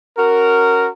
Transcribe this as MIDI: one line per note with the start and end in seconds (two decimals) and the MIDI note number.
0.17 0.89 61
0.17 0.89 66
0.17 0.89 70